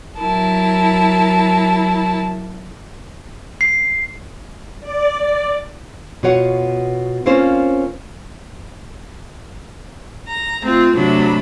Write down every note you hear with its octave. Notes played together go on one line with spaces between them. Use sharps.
F#3 E4 A#4 A5
C7
D5
B2 F4 F#4 C#5 F#5
A#3 C4 C#4 F4 C5
A#5
A3 C4 F4
C3 F#3 A3 D4 B5